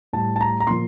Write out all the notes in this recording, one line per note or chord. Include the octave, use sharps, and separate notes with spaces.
A2 G3 A5
A5
A#5
A#5
A#2 F3 C6